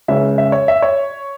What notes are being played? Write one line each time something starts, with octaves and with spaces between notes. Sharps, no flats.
C#2 C#3 G#3 C#4 E5
E5
C#5
E5
C#5